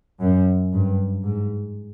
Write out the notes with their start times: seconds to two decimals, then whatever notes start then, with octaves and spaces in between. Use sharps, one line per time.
0.22 F#2
0.73 G2
1.23 G#2